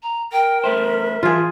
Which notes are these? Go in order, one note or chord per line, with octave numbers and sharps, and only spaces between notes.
A#5
A#4 G5
A3 B4 C5 E5
E3 F3 F4 G#4